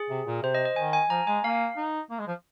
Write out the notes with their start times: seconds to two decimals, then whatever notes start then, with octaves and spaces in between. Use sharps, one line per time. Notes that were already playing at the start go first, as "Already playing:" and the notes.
Already playing: G#4
0.10 C3
0.26 A#2
0.43 C3 C5
0.55 D#5
0.65 D#5
0.76 D#3 G#5
0.93 G#5
1.10 F3 A#5
1.27 G#3 G#5
1.44 A#3 F5
1.77 D#4
2.10 A#3
2.19 G#3
2.27 F3